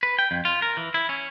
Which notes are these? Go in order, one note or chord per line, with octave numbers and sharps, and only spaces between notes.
B4
G5
F2
F4
A#4
E3
E4
C#4